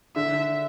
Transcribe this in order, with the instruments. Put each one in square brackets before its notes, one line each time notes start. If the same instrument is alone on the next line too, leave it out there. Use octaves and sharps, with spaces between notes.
[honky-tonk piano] D3 [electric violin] E5